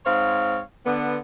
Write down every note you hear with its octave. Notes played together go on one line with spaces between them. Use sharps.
G#2 C4 C#5 F5
D3 B3